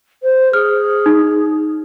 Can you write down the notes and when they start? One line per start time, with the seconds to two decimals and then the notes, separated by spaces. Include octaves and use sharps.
0.23 C5
0.53 G#4 F6
1.06 D#4